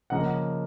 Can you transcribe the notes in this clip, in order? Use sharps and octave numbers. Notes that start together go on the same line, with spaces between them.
C#3 F3 A#3 D#5 F#5